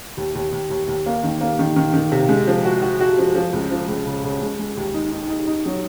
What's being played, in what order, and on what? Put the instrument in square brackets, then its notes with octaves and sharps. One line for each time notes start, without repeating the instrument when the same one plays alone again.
[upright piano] D#2
D#2
D#2
D#2
D#2
A#3
D#3
A#3
D#3
D#3
D#3
C3
G#3
F3
F#4
F#4
F#4
F3
F3
C#2
F3
C#2
C#3
C#3
G#3
G#3
D#2
D#4
D#4
D#4
D#4
F#3